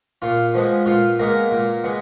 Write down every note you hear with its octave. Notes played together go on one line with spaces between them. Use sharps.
A#2 F4
F3 G#3 B3
A#2 F4
G#3 A#3 B3 A#4
A#2
G#3 B3